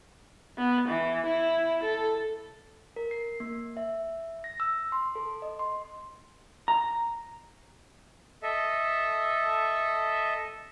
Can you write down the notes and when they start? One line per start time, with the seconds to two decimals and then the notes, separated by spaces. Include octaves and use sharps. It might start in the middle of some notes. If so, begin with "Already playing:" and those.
0.58 B3
0.88 E3
1.26 E4
1.83 A4
2.96 A#4
3.11 C7
3.40 A#3
3.77 E5
4.44 A#6
4.60 E6
4.92 C6
5.15 A4
5.42 D#5
5.59 C6
6.68 A#5
8.43 A4 D#5 E5